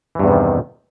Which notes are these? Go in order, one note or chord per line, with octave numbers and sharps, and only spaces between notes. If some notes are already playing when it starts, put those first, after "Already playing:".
E2 G2 C3 D#3 E3